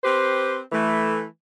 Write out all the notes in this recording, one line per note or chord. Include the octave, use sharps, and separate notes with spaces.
C4 G4 B4 C5
E3 A3